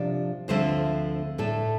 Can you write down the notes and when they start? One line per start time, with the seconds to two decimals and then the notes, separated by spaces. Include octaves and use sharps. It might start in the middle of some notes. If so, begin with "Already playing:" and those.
Already playing: C3 F3 D4 D5
0.48 D2 D3 F3 A3 C4 C5
1.38 A2 A3 D4 A4